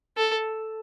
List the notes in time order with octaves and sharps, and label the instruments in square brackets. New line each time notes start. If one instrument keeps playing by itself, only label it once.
[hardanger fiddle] A4